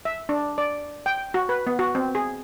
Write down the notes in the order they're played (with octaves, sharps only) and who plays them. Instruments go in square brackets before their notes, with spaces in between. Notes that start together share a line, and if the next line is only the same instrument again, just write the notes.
[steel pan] E5
D4
D5
G5
F#4
B4
B3
F#4
C4
G#4